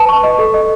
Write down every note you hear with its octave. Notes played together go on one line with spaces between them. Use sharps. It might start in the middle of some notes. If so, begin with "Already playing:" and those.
Already playing: B4 A5
C#6
D#5
A4
D#5